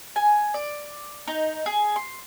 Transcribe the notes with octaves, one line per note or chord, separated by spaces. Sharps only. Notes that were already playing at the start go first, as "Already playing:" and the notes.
G#5
D5
D#4
G#4
C6